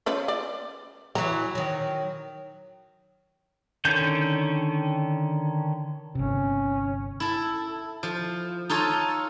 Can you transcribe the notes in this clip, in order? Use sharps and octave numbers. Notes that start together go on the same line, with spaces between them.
F3 C#4 B4
D5
E3 F#3 A#5
D#3 F#3
D3 D#3 C#4 G6
G1 C3 C#4
E4 A4
F3
D#4 F4 A4 C#5